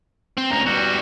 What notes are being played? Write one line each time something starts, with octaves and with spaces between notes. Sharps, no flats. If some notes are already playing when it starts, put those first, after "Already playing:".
C4
D2 C#4 A#5
E2 G3 F#4